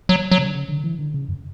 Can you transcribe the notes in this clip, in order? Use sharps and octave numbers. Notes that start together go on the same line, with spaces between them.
F#3
F#3
C#3
D3
C#3
D3
E3
D3
C#3
F#2